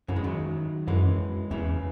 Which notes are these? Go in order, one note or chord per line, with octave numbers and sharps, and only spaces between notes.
F#2 C#3 E3
G#3
D#3 F#3
F#2 E3 G#3
E2 C#3 E3